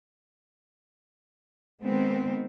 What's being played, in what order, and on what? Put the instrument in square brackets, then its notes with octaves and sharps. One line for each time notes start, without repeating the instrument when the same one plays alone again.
[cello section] D#3 G#3 B3 C4